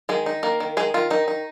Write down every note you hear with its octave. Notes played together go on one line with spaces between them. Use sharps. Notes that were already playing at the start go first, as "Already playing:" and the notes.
D#3 G#3 G#4
D#4
D#3 A#3 A#4
D#3
D#3 G#3 G#4
D#3 F4
D#3 D#4
D#4